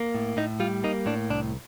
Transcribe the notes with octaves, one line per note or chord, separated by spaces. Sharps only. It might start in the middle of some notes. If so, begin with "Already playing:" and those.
Already playing: A#3
A2
A2 D#4
G3 F4
A#3 D#4
A2 D4
C2 D4